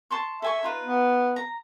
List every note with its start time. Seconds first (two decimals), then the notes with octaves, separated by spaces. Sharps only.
0.10 A5 C6 C#6
0.42 A4 E5 G#5 C#6
0.63 D#4 F4 B4
0.82 B3
1.36 A#5